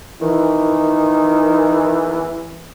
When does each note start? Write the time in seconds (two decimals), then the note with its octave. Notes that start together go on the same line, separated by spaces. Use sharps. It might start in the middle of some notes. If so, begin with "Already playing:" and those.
0.21 D#3 E3